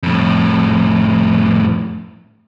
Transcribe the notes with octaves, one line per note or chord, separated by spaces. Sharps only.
F2 A2